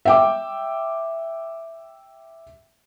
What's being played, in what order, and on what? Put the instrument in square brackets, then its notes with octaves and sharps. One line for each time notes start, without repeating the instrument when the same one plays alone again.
[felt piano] E5 G5 D6